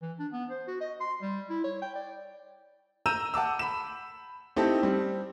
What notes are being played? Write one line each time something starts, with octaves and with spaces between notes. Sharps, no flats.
E3
D4
B3
C5
F#4
D#5
C6
G3
E4
C#5
G5
D5
A#5 E6 G6 D#7 E7
F#5 A5 D6 E6
B5 E7
A3 C4 D#4 E4 G4 A4
G3 C4